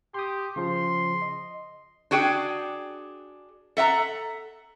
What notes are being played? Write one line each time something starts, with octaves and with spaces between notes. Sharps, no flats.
G4 C6 D#6
C#3 F3 C6
D#5
D4 F#4 G#4 G5
A4 E5 F#5 A#5